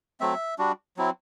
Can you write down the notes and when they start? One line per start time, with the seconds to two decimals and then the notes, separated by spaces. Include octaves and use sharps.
0.21 F#3 A3 C4 E5
0.59 G3 D4 F#4
0.97 F#3 C4 E4